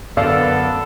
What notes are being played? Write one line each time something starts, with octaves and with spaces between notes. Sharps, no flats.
F#2 D3 B3 A4 D5 F5